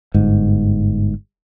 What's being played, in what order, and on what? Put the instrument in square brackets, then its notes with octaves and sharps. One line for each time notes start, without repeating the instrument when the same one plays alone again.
[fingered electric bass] G1 G#2